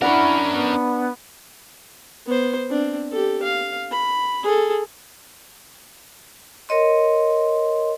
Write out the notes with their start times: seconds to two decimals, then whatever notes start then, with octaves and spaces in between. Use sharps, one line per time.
0.02 C#4 D4 E4 A#4 F#5 B5 C#6
0.48 B3
2.26 B3 C5
2.69 C4 D4
3.12 G4 A4
3.43 F5
3.92 B5
4.43 G#4 A4
6.69 A#4 C#5 D#5 C6